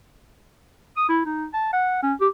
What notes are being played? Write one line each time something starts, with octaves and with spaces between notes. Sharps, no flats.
D#6
E4
D#4
A5
F#5
C#4
G4